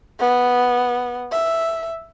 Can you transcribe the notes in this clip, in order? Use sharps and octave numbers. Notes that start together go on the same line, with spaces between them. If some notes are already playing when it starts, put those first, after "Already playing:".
B3
E5